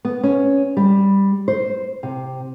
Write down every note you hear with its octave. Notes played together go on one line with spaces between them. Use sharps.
B3
C#4
G3
C5
C3